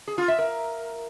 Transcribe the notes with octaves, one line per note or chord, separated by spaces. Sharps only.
G#4
F4
E5
A#4